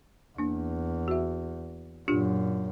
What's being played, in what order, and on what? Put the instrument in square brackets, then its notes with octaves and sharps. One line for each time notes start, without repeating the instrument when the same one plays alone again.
[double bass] E2 [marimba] A#3 D4
[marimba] F#4 E5
[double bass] F#2 A#2 [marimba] D4 F4 G4